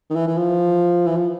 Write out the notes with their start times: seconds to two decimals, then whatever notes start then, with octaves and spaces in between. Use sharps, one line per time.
0.10 D#3
0.16 E3
0.27 E3
0.37 F3
1.07 E3
1.16 F3